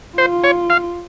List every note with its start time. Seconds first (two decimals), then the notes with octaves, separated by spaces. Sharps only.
0.18 F4 C5
0.44 C#5
0.70 F5